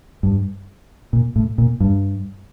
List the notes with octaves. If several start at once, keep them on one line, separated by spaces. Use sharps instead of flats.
G2
A#2
A2
A#2
G2